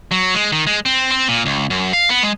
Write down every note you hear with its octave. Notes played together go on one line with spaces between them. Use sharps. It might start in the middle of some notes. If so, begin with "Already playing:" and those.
F#3
G#3
D#3
G#3
C4
C4
A#2
C#2
F#2
F5
B3
G#3